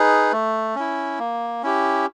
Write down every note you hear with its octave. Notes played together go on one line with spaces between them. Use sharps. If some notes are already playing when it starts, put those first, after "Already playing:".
Already playing: D#4 G#4 B4
A3
C#4 E4
A#3
C#4 E4 G4